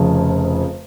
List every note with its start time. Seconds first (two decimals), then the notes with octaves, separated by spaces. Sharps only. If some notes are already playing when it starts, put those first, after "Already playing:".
Already playing: F1 F2 C#3